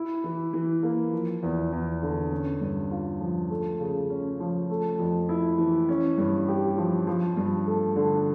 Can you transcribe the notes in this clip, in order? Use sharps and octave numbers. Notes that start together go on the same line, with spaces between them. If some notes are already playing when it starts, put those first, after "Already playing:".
Already playing: E4
E3
E3
A#3
F3
E2
E2
D3
C#4
G2
F4
F3
A3
C#3
C#4
F3
A3
F2
E4
E3
C#4
G2
G4
F3
F3
G2
A3
D3